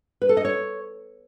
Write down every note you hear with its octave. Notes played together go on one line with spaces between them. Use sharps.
B4
A4
D#5
C#5